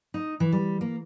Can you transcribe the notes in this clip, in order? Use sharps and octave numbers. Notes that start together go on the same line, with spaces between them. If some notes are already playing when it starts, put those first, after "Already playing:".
D#4
E3
G3
A#3